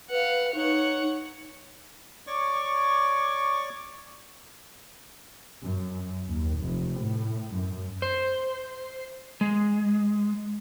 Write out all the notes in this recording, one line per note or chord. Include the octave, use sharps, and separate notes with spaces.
B4 F5 F#5
D#4 C#5 F#5
C#5 D5 C#6 D6
F#2
D#2
F1
A2
F#2
C5
G#3